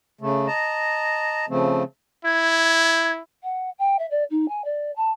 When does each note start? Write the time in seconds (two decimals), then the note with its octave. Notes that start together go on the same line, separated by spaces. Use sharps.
0.21 C#3 A3
0.47 D#5 A5 A#5
1.49 C#3 F3 A3 C4
2.25 E4 G#6
3.43 F#5
3.79 G5
3.99 E5
4.11 D5
4.31 D#4
4.49 G#5
4.65 D5
4.96 A5